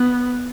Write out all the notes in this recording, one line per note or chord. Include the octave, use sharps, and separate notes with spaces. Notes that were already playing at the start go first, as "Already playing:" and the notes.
Already playing: B3